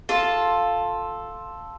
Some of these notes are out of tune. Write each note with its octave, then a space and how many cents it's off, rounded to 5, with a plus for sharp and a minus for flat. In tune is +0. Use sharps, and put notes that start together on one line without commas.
F4 +5 A4 +0 A5 +0